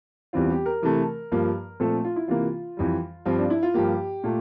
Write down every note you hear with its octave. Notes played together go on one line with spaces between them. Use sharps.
E2 E3 G3 C4 F4
G4
A#4
C3 E3 A3
G2 F3 A#3
A#2 F3 A3 C4 A4
F4
E4
C3 E3 A#3 F4
F2 E3 G3
G2 F3 C4 F4
D4
E4
F4
G2 F3 A#3 G4
A#2 A3